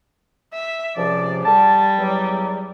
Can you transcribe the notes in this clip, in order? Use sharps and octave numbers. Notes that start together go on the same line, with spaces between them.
E5
C#2 C3 F3 D5
G3 A5
E2 F#3